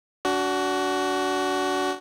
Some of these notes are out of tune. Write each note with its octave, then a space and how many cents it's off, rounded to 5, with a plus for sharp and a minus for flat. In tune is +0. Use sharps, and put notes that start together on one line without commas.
D4 -30 F#4 +15